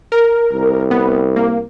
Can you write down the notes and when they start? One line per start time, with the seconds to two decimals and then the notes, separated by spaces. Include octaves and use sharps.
0.12 A#4
0.53 C2
0.91 B3
1.36 A#3